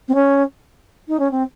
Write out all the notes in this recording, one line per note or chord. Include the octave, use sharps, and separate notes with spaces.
C4
C#4
D#4
C#4
C4